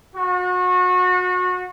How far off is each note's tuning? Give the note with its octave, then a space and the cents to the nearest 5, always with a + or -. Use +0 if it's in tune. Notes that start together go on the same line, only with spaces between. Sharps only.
F#4 -30